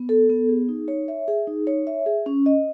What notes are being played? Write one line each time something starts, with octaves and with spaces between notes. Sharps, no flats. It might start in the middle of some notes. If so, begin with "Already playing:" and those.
Already playing: B3
A4
B3
G#4
D#4
C#5
E5
G#4
D#4
C#5
E5
G#4
C#4
D#5